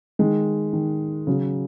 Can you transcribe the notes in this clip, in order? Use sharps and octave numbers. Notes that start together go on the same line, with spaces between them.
D#3 G#3
D#3
C#3 F#3